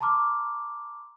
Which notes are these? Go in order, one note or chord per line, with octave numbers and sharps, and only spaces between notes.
A5 A#5 C6 D6 F6